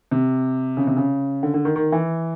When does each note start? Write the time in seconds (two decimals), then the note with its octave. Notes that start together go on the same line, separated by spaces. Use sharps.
0.11 C3
0.77 C#3
0.87 C3
0.97 C#3
1.43 D3
1.54 D3
1.65 D#3
1.76 D#3
1.92 E3